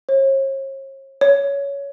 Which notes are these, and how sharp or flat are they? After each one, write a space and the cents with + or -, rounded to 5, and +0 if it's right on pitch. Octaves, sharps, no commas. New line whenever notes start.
C#5 -45
C#5 +15